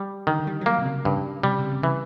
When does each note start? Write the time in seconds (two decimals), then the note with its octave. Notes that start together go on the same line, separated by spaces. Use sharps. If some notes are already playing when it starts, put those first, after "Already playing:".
Already playing: G3
0.27 D3 D#3
0.47 G3
0.61 F#3
0.66 G3 A#3
0.82 C3
0.85 C#3
1.05 G2 C#3
1.43 C3 G3
1.52 C#3
1.59 C3
1.65 C#3
1.72 C3
1.83 C#3 E3